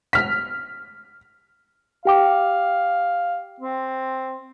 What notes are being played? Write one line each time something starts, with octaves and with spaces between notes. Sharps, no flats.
F6 B6
G4 F5 G5 D6
C4